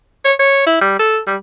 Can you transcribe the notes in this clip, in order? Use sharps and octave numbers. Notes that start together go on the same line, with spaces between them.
C#5
C#5
E4
G3
A4
G3